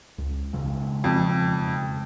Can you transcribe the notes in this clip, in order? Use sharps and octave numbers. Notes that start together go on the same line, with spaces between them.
C#2
E1 C#3 G#3
F2